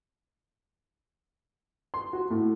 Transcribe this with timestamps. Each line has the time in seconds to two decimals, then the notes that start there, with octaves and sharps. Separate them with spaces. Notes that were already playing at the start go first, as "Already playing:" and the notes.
1.94 C6
2.13 F#4
2.30 A2